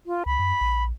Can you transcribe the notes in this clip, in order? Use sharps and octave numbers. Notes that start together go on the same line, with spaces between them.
F4
C#2 B5
F#2
A#1